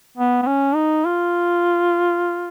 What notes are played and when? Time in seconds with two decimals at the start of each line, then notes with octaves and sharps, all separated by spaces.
0.17 B3
0.43 B3
0.47 C#4
0.75 D#4
1.05 F4